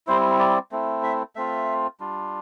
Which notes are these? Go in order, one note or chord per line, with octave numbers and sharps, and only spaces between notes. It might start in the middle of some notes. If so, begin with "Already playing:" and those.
G3 C4 E4 C5
D5
A3 C4 E4
E5
A3 C4 F4 E5
G3 D4 F4